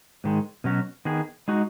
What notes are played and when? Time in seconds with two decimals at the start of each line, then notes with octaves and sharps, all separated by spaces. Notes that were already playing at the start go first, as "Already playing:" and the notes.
0.24 G#2 D#3 G#3
0.64 B2 F#3 C#4 F#4
1.05 D#3 B3 G#4
1.48 G#3 D#4 F#4